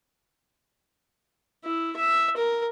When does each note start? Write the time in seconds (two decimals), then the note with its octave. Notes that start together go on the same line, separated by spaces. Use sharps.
1.64 E4
1.96 E5
2.37 A#4